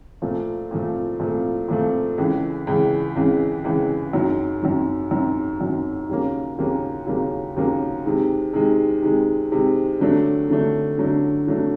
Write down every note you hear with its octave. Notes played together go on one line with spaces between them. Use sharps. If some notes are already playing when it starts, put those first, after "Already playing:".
A#2 F3 A3
A#2 F3 A3
A#2 F3 A3
A#2 F3 A3
C#2 C#3 E3
C#2 C#3 E3
C#2 C#3 E3
C#2 C#3 E3
F#2 D#3 F#3
F#2 D#3 F#3
F#2 D#3 F#3
F#2 D#3 F#3
D#2 C#3 F#3 A#3 C#4
D#2 C#3 F#3 A#3 C#4
D#2 C#3 F#3 A#3 C#4
D#2 C#3 F#3 A#3 C#4
C3 D#3 G#3
C3 D#3 G#3
C3 D#3 G#3
C3 D#3 G#3
D3 F#3 A3 D4
D3 F#3 A3 D4
D3 F#3 A3 D4
D3 F#3 A3 D4